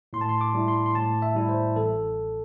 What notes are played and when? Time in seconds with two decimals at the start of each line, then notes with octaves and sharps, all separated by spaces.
0.13 A2 C6
0.21 A5
0.29 C6
0.41 D6
0.54 G3 E4
0.68 C6
0.86 C6
0.95 A2 A5
1.22 E5
1.35 G3 E4
1.49 C5
1.76 A1 A4